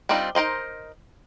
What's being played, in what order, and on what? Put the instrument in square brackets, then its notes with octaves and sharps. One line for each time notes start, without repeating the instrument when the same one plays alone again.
[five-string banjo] G3 C4 D4 D#4 F4
D#4 A#4 C5 D#5